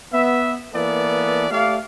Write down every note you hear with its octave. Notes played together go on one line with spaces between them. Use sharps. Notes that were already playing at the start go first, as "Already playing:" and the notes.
B3 E5
E3 A#3 B3 A4 D5
A3 G4 D5 F5